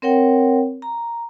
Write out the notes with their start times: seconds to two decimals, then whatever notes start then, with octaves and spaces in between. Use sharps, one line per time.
0.02 C4 A#4 C#5 F#5 G5
0.82 A#5